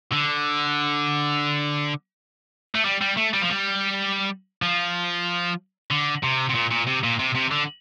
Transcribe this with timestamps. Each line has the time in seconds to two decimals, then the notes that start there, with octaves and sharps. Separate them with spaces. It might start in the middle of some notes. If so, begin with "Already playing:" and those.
0.12 D3
2.75 A3
2.85 G3
3.01 G3
3.17 A3
3.34 G3
3.42 F3
3.50 G3
4.62 F3
5.91 D3
6.23 C3
6.49 C3
6.54 A#2
6.71 A#2
6.87 C3
7.04 A#2
7.19 C3
7.35 C3
7.52 D3